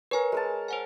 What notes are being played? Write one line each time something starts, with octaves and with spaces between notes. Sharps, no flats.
A#4 B4 C#5 G#5
G#3 A#4 A5
C5 F#5 G#5